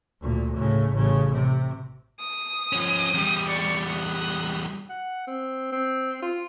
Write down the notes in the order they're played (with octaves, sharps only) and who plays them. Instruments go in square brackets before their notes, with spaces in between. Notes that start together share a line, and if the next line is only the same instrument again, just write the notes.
[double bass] D2 A#2
A2 C#3
A1 C#3
C3
[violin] D#6
[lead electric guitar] F3 C#4
E2 G3
[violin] D5 C#6
D#6 F#6
[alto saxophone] F#5
C4
C4
F4